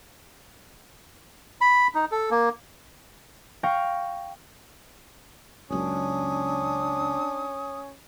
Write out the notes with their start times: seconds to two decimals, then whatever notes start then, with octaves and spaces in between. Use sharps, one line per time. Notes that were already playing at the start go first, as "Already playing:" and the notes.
1.61 B5
1.95 D#4
2.11 A4
2.31 A#3
3.63 F5 G5 C#6 A#6 C#7
5.70 F#1 C#2 F#2 C#4 D4 D#6